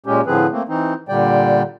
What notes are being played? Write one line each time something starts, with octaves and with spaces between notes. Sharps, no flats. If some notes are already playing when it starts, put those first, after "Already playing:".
A#2 G#3 C#4 G4
A2 D3 F3 C4 G#4 B4
A3 A#3 C4
E3 C4 D#4
A#2 D3 G3 D5 G5